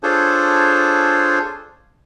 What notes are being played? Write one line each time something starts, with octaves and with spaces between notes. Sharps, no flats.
D4 F4 G#4 A4 C5 C#5